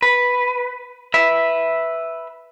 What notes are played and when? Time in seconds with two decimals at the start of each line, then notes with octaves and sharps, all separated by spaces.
0.02 B4
1.14 B4 E5